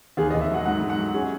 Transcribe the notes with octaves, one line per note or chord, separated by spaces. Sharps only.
D#2 G#4
D#5
D#2
E5
F#3 F#5
G#2 F#5
G#2
F#5
F#3
C#4 G#4